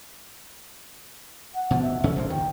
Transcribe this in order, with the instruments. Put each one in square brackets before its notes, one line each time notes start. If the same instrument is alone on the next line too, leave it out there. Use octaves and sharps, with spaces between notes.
[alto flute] F#5
[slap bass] B2 F3
[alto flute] E5
[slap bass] E2 C#3 C#4 [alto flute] A4
[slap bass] A#1 C3 A#3 [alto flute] C5
[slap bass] D#3 [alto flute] G5